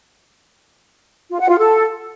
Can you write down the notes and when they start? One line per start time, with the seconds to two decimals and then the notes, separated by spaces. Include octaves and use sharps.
1.31 F4
1.40 F#5
1.49 F4
1.58 A4